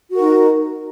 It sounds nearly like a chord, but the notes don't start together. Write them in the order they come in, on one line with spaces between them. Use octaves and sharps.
F#4 A#4 D#4